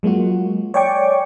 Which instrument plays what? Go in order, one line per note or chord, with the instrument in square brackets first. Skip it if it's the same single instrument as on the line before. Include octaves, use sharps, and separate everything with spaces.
[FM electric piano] F#3 G#3 A#3 F4 F#4
C#5 D5 G5 G#5 C#6 D6